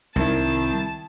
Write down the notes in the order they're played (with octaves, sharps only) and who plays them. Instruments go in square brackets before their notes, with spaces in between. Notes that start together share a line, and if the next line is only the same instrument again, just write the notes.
[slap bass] C2 [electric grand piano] D#3 E4 [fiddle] A5